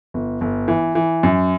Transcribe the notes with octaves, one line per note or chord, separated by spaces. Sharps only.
G1
G1
E3
E3
F#2